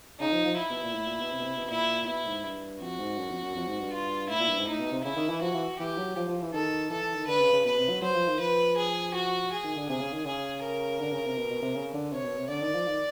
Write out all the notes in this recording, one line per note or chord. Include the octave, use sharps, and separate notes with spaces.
C#3 D#4
F3
F3
E4
B2
A#2
A2
A#2
B2
C3
B2
C3
B2
A#2 E4
B2 E4
G#2
G2
F2 F#4
G#2
F#2
F2
F#2
F2
G#2
G2
F4
A2 E4
A#2
G2
G#2
A2 D#4
B2
C3
C#3 E4
D#3
E3
F3 F#4
E3
E3 G4
F#3
F3
F3
E3
D#3 A4
E3 A4
E3
D#3
D3 B4
C#3
C#3
B2 B4
C3
F#3
F#3 C5
F3
D#3
F3 B4
G#4
F#4
G#4
D#3
D3
C3 G#4
C#3
D#3
C#3 G#4
A#4
D3
C#3
C3
B2
B2
C3
C#3
D3
C3 C#5
B2
C3
D3 D5
D#3
F3
D#3